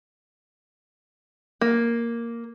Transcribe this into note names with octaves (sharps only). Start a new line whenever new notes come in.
A#3